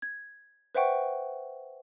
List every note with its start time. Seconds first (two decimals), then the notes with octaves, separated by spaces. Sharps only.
0.02 G#6
0.75 B4 C5 E5 F#5 G5 C#6